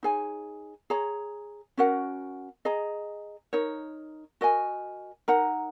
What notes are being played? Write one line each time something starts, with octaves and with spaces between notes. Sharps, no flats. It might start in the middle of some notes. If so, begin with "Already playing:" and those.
D#4 G#4 C#5 G#5
G#4 C#5 A#5
C#4 F#4 A#4 F#5
G#4 D#5 A#5
D#4 A#4 C#5
F#4 A#4 D#5 G#5
D#4 A#4 F#5 A#5